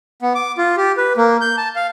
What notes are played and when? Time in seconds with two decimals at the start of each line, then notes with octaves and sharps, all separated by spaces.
0.22 B3
0.35 D6
0.58 F4
0.77 G4
0.97 B4
1.17 A#3
1.41 G6
1.58 A5
1.76 F5